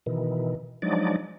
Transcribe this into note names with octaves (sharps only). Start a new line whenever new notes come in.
B2 D#3 E3
F3 F#3 G#3 D4 D#4 D5